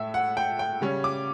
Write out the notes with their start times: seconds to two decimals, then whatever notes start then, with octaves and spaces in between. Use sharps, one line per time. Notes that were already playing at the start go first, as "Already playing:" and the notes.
Already playing: A2 A3 E5
0.14 F#5
0.37 G5
0.59 G5
0.81 C#3 G3 C#4
1.04 D6